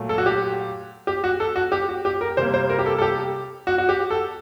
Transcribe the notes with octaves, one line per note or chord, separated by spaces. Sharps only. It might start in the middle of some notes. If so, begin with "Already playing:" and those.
Already playing: A#2 F#3 A3
A4
F#4
G4
G4
F#4
A4
F#4
G4
F#4
G4
A#4
C3 G3 A#3 C5
C5
A#4
G4
A4
A4
G4
F#4
F#4
G4
A4